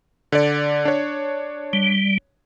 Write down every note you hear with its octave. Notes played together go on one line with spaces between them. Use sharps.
D3 D5
D4 C#5
G3